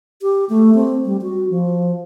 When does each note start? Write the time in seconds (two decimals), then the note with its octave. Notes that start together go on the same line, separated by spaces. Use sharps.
0.22 G4
0.49 A3
0.75 C4
1.05 G3
1.22 F#4
1.50 F3